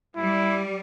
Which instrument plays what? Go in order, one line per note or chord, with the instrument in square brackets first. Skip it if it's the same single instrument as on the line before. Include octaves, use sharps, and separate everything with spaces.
[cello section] G3 [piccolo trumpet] E4